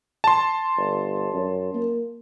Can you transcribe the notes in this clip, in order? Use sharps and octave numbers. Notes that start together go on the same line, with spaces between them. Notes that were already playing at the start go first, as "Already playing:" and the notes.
A5 C6
G1
F#2
A#3